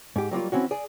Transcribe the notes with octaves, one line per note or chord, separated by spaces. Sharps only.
G#2 G4
F#3 G3 A#3 F4
E3 C4 C#4 F#4
G#4 D5